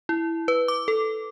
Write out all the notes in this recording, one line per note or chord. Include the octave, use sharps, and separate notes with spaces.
E4
B4
D6
A4